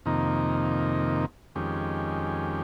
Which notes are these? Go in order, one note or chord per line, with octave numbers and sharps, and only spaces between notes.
F2 C3 D#3 A#3 D#4
F2 D#3 G#3 C#4 G4